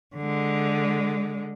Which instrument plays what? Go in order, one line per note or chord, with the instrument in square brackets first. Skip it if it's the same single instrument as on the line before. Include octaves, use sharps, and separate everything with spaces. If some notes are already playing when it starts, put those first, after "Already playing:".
[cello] D3 G#3